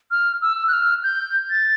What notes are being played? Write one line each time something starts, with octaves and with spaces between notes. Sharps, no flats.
F6
E6
F#6
F6
G6
A6